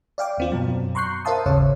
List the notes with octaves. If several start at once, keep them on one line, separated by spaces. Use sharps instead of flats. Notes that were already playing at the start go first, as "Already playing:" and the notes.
D5 F5 G5 D6
D#2 C4 F4
F#2 B2 F#3
A#5 C6 C#6 F#6 G6 C7
A#4 C5 E5 F5 A5 D#6
G#1 D#2 C#3 C#5